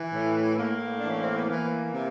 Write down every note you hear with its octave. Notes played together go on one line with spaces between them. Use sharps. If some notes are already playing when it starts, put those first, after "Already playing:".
Already playing: E3
A2
A2 A#3
D4
E3
C#4
C4
B3
E3 A#3
C3